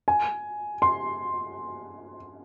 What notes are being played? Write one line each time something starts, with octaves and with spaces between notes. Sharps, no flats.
G#5
C6